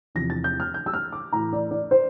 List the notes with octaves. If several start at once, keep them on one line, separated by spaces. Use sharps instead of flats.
E2 C3 F3 A#6
A6
G6
F6
G6
E6
F6
D6
A2 E3 A#5
D5
D5
C5